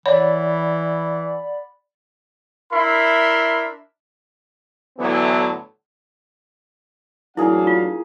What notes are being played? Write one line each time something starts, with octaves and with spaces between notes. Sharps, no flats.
E3 C#5 D5 F#5 B5
D4 E4 A#4 E5 B5 C6
A2 D3 E3 F#3 B3
A1 F#3 A#3 D4 E4 G#4 A#4 F5
F4